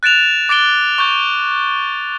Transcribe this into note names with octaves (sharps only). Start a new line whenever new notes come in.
F#6 A6 D7 E7 F7
D6 A6 D7 G7
C#6 G6